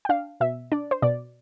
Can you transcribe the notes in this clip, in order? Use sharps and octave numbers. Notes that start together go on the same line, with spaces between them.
G5
D4 F5
B2 E5
D4 D5
C5
B2 D5